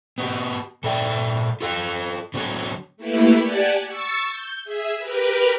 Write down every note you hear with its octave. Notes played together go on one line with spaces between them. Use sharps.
B3 F#4 G4
A#2 A4 D5 E5 G5
F4 A4 F5
D3 F#3 B3 F#4 C#5
A3 A#3 E4 G4 B4
G4 D5 F#5 G#5 A5
C#6 E6 A6
G6
G#4 E5
G4 A#4 B4